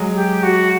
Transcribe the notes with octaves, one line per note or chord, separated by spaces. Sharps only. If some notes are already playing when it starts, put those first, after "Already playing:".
Already playing: F#3 G#3
G4
F#4